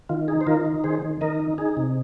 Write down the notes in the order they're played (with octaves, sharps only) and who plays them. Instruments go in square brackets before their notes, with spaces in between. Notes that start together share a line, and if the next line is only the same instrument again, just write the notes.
[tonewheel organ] D#3 F4
D#4 G#4
C5
D#3 F4 A#4
D#4
D#3 G#4 C5
D#3
D#3 A#4 D#5
D#4
D#4 G#4
C3